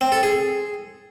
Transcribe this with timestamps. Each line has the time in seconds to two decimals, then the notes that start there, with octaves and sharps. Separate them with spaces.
0.01 C4
0.12 A4
0.23 G#4